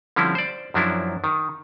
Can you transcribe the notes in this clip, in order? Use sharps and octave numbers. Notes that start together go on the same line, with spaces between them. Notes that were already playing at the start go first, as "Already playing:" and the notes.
D3 F3 G3 C4 C#4 E4
C5 D5
F#2 F3 F#3 D4 E4
D#3